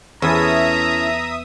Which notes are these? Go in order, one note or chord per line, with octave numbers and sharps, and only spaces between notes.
E2 C#4 E4 A4 E5 A#5 D#6